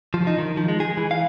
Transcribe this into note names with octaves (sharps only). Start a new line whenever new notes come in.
F3
D#4
D#3
F3
G#3
G#4
E3
F5